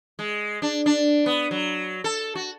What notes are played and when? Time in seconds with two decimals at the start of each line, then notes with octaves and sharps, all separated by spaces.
0.19 G#3
0.62 D4
0.86 D4
1.26 B3
1.51 F#3
2.04 A4
2.35 F#4